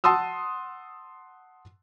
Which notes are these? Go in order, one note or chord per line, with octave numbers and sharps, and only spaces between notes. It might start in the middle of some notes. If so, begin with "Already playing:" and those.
F#5 A5 C6 D#6 E6